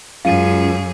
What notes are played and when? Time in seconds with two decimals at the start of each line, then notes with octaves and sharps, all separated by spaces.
0.25 C#2 F#2 G#4 F5 D#7